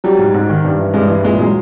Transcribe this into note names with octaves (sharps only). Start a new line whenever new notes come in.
F#3 G3
G#2
G#2
D#3
G2
E3
G2 G#3
E3
A#2 G#3
F#3 G#3